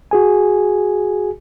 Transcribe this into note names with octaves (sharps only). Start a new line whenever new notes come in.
F#4 G#4 G#5